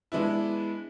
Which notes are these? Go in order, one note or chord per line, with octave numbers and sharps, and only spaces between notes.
G#3 B3 D4 E4